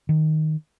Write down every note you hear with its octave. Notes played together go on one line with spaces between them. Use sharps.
D#3